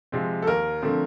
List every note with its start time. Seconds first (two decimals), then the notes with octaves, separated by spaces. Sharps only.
0.12 C3 F3 G#3 C4
0.42 A4
0.47 D#2 A#4
0.82 D3 F3 A3 C4